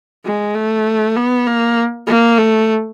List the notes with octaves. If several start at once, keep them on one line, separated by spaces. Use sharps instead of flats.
G#3
A3
B3
A#3
A#3
A3